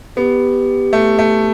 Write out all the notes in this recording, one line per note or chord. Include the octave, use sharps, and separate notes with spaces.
B3 G4
A3
A3